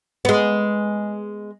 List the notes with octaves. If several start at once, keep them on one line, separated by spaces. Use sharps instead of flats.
G#3 B3